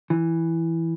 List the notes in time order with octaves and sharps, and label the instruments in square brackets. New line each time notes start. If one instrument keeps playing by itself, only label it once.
[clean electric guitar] E3